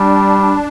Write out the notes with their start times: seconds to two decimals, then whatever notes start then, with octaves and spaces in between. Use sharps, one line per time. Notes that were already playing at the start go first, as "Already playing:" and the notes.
Already playing: G3 D4